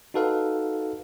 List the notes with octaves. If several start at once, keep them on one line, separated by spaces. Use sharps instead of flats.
D#4 F#4 A4 B4 F5